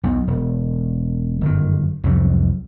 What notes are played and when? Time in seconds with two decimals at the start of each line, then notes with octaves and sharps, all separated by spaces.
0.03 B1 E2
0.27 E1
1.41 G1 F#2 A#2 D#3
2.04 C2 F2 G#2 F#3